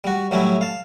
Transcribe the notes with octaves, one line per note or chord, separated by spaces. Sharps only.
G3 F#4
A2 F#3 G3 C#4 E4
F5 A5